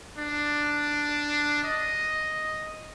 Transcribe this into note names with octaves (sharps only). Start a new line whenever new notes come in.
D4
D#5